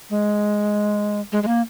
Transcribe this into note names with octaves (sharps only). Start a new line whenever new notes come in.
G#3
G#3
G#3
A#3